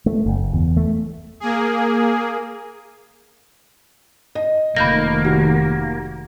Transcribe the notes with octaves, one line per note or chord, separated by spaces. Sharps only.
A3
F#1
E2
A3
A#3 G#4
D#5
F1 D#3 A#3 B5 G6 A#6
F#4 G4